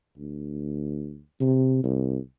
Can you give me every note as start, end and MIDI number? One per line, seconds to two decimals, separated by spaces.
0.18 1.21 38
1.40 1.82 48
1.84 2.18 36